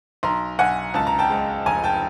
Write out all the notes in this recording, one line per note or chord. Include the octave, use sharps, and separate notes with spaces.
B1 A#5 C6
B1 F#5 G#5
C#2 A5
A#5
G5 A5
G#3
F1 G#5 A#5
G5 A5